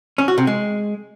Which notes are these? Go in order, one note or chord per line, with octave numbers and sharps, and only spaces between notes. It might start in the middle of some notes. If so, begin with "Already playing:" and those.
C#4
F#4
C3
G#3